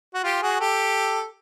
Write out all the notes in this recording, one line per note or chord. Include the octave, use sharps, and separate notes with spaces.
F#4
F4 G4
F#4 G#4
G4 A4